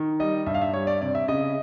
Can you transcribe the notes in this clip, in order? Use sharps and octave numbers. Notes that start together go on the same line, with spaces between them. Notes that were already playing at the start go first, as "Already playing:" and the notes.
Already playing: D#3
G3 D#5
G2 E5
F5
E5
G3 C#5
D5
C3 D5
E5
C#3 D#5